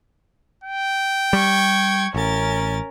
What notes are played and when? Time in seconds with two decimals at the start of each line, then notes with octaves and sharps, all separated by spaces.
0.64 G5
1.33 G3 C#6 G#6
2.14 A1 C#4 A#4 A6